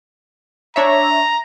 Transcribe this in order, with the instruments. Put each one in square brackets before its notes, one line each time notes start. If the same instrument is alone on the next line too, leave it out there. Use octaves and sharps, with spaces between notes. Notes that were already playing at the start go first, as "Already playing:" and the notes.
[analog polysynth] D4 C#5 E5 [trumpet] A#5